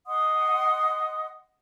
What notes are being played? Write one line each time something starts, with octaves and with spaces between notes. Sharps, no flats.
D#5 F#5 C6 D#6